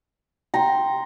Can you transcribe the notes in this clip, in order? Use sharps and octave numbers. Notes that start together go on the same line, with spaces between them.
G5 A#5 C6